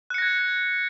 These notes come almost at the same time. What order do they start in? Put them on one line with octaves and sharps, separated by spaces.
F#6 C#7 A#6 G#6